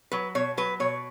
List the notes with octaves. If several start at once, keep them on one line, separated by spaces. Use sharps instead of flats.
F#3 B4
B2 C#5
F#3 B4
B2 C#5